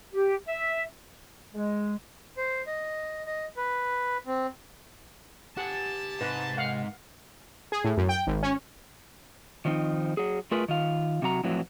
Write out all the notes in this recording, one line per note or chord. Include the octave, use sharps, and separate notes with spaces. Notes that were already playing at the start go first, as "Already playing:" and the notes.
G4
E5
G#3
C5
D#5
D#5
B4
C4
G4 F#5 G#5 A5
G#2 C3 B4
F5 F#5
G#4
A2
F#2
G5
G#1
C#4
D#3 F3 C4 D#4
F#3 G#4
A3 F4 G#4 A#4 B4
D#3 F4 F5
C3 F#3 F#4 A#5
F2 A2 E3 F#3